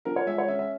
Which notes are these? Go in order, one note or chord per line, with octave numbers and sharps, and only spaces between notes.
F3 A#4
C#5
G#3 E5
C#5
C#4 E5
E5